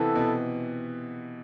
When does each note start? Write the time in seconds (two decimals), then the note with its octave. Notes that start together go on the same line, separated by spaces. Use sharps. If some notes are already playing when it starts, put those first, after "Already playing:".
Already playing: C3 E3 B3 E4 A4
0.16 B2